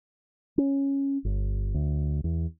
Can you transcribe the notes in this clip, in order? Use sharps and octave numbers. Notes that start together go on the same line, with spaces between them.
C#4
G1
D2
E2